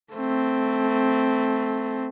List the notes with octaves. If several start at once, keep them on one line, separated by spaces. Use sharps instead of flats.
A3 C4